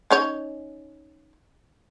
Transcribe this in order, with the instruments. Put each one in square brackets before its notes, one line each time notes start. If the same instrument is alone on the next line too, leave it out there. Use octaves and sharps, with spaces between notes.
[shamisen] C#4 D#4 C#5